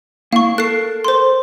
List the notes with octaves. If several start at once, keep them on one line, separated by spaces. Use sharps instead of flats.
A#3 E4 F5 C#6
A4 A#4 F#6 C7
C5 C6